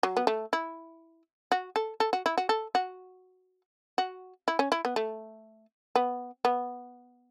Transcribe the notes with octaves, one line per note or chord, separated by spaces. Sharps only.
F#3
B3
A3
E4
F#4
A4
A4
F#4
E4
F#4
A4
F#4
F#4
E4
C#4
E4
B3
A3
B3
B3